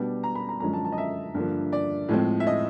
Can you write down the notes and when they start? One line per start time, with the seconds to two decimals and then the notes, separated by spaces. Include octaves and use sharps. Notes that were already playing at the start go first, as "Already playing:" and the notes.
Already playing: B2 G3 B3 D4
0.23 A#5
0.35 B5
0.49 A#5
0.60 F#2 D3 F3 G#3 C#4 A#5
0.73 A5
0.85 A5
0.92 D#5
0.98 E5
1.34 G2 D3 F3 A#3
1.73 D5
2.09 A2 F3 G#3 C4
2.40 E5
2.47 D#5